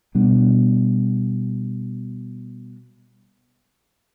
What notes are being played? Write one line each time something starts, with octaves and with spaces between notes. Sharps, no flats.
B2 G3 B3 D4